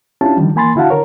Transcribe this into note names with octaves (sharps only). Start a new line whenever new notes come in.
C#4 D4 E4 F4 G4 A5
D3 D#3 F3 G3
E3 A#3 G#5 B5 C6 A6
D3 E4 F#4 F5 F#5 A5
D3 A#4 C#5